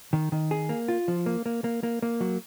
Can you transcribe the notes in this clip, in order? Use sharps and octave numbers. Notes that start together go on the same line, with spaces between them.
D#3
D#3
G#4
A#3
F4
F3
A#3
A#3
A#3
A#3
A#3
F#3